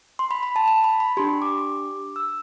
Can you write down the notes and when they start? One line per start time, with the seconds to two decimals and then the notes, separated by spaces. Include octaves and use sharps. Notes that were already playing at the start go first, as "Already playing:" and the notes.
0.19 C6
0.31 B5
0.43 B5
0.56 A5
0.68 A5
0.84 B5
1.00 B5
1.17 D4 G4 C6
1.42 D6
2.16 E6